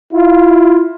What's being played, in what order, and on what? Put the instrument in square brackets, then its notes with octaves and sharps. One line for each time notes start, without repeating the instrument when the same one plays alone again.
[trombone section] E4 F4